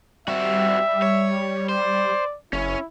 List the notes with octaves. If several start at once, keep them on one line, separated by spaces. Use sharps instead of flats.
G3 C4 F#4 E5
C#5
C5 D5
F#1 C#4 E4 C#5